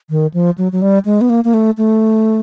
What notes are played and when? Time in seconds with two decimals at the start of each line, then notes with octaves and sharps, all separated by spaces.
0.10 D#3
0.34 F3
0.58 F#3
0.72 F#3
0.82 G3
1.05 G#3
1.21 B3
1.30 A#3
1.44 A#3
1.54 A3
1.78 A3